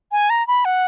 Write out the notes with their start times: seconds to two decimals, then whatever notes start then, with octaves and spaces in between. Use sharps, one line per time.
0.12 G#5
0.30 A#5
0.47 B5
0.65 F#5